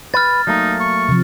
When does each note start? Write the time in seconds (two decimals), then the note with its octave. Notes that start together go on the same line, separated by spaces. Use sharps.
0.14 B4 F6 A6
0.47 F#3 A3 A#3 D#4
0.80 C#6
1.09 C3 F3